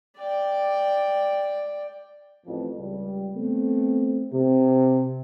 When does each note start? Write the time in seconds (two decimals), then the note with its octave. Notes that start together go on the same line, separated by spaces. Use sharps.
0.17 D5 G5
2.46 A1 F2
2.77 C#2 G3
3.35 A3 B3 C4
4.32 C3